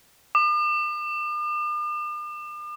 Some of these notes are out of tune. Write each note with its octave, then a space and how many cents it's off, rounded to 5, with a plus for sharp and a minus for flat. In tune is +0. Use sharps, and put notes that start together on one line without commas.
D6 +45